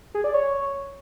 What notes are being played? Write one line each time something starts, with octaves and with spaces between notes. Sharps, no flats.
G#4
D5
C#5